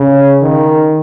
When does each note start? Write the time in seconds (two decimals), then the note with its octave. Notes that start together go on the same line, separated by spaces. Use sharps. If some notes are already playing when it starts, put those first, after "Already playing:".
Already playing: C#3
0.42 D#3